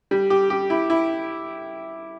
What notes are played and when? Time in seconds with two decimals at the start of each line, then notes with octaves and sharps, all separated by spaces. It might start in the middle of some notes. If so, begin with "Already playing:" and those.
0.11 G3
0.30 G4
0.50 G4
0.70 E4
0.90 E4